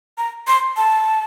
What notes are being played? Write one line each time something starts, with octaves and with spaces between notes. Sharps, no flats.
A#5
C6
A5